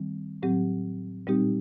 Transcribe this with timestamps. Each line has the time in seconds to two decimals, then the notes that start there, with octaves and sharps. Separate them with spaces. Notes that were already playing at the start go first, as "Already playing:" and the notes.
Already playing: D#3 G3 C4
0.43 A2 F#3 C4 G4
1.27 A#2 G3 C4 D#4 G4